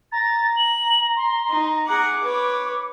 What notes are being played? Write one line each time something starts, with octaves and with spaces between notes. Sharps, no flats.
A#5 A6
F#7
C6
D#4
G#4 F#5 D6
B4 C#5